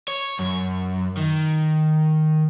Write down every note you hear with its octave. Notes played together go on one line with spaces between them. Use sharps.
C#5
F#2
D#3